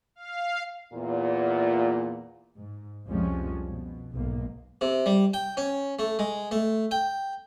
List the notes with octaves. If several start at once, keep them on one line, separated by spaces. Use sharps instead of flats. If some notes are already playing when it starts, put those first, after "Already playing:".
F5
E2 A#2
G#2
C2 F2 F3 G3 G#3 C#4
B2
B1 G#2 A#3
C3
G3
G5
C#4
A3
G#3
A3
G5